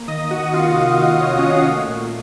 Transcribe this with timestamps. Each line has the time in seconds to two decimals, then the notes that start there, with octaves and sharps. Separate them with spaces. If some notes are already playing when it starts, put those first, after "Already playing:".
Already playing: A#3
0.08 D#3 D#5 D#6
0.31 D#3 F#4 F#5
0.46 F#5
0.53 C3 F4 F5
0.76 C3
0.98 D#3
1.21 C3 C#5
1.30 D#5
1.38 C#4 C#5
1.43 A#3
1.66 A3
1.88 A#2